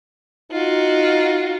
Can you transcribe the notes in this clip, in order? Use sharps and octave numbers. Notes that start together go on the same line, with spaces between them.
D#4 F4 F#4